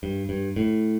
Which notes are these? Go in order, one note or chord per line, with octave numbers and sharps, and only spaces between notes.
G2
G2
A2